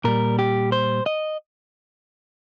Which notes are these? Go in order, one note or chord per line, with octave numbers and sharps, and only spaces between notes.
A#2 G3 A#4
G4
C5
D#5